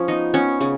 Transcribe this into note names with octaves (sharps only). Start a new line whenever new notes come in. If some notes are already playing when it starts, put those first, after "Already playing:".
Already playing: F3 C#4
B3 D#4
B3 C#4
C#3